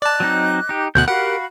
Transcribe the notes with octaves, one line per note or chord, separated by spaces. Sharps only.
D5 D#5 A5 D6 F#6
F#3 C4 D#4
D#4 G4
D2 B2 F#5 F#6 G6
F#4 G4 A#4 F5 F#5 B5